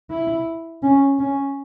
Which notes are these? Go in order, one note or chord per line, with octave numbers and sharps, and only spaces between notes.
E4
C#4
C#4